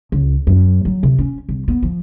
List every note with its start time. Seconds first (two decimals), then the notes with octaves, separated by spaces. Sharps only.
0.12 C#2
0.47 F#2
0.85 F#3
1.03 C3
1.18 C#4
1.49 C2
1.68 B3
1.82 F3